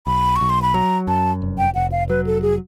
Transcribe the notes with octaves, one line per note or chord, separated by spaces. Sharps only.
B1 B5
C#6
B1
C6
B5
F#3 A#5
F#2 A5
F1
G5
F1 F#5
F5
F#3 B4
A4
G#4